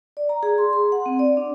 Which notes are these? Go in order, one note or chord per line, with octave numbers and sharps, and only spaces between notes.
D5
A#5
G#4
C6
C6
F#5
C4
D5
D4